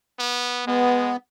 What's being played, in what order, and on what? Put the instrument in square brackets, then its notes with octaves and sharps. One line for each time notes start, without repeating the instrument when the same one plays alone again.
[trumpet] B3
[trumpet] G#3 [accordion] B3